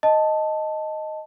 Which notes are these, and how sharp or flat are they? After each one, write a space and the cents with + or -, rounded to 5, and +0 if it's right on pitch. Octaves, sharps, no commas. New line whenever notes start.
D#5 +0 A5 +0